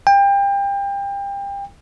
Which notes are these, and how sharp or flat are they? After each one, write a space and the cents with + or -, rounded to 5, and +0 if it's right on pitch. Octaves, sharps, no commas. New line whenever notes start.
G5 +30